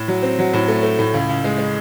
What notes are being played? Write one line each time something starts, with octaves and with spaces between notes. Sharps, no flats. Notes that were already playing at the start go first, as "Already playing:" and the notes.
Already playing: A2
F#3
C4
F#3
A2
A3
A3
A2
C#2
C#2
G#3
G#3